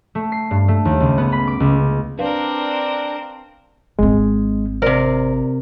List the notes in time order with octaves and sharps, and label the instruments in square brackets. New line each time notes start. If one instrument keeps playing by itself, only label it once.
[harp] A3
C7
G2
A3
D#2
C#2
B3
B5
D6
C#2
[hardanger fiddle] C4 A#4 [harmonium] D4 [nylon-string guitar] B4 F5
[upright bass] G#1 C4 [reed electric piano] G#3
[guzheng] C3 A#4 [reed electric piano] C5 D5